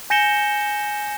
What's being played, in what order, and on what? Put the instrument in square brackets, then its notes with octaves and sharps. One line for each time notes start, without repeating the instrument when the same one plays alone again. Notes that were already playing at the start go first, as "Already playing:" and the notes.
[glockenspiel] G#5 G6 A#6 C#7 E7 G7